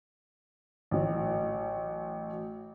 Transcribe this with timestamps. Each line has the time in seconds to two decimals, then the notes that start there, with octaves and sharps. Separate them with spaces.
0.91 A1 F#3